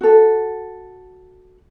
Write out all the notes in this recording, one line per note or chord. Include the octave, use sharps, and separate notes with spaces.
F#4 A4